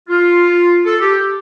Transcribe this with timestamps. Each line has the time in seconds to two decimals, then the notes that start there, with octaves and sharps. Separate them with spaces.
0.09 F4
0.86 A4
1.01 G4